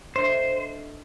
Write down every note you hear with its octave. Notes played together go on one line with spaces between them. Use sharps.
D3 A3 D#4 C5